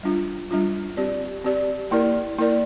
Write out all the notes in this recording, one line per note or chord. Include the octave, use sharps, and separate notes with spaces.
G3 D4 F4
G3 D4 F4
C4 G4 D5
C4 G4 D5
A#3 E4 A#4 D5
A#3 E4 A#4 D5